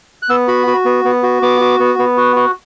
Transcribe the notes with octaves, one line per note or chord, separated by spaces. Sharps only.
F#6
B3 E6
F#4 B5
F#4
B3
B3
F#4
B3 D6
F#4
B3
B3
F#4
F#4